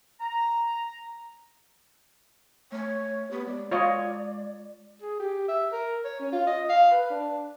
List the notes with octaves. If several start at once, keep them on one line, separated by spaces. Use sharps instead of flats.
A#5
A3 C#5
B3 G4
G#3 D5
F4 C#5 D#5
G#4
G4
E5
A#4
C#5
C#4
F4
D#5
F5
B4
D4